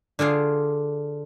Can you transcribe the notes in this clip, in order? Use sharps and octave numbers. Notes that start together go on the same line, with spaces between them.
D3 F4 G#4 F5